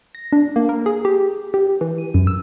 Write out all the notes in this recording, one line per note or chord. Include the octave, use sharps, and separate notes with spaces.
A#6
D4
A#3
A#4
G#4
G4
G4
E3
D#7
F#2
E6